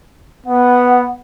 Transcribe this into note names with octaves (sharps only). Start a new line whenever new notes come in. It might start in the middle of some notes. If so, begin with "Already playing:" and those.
B3 F#5